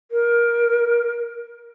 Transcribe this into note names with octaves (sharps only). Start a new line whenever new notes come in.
A#4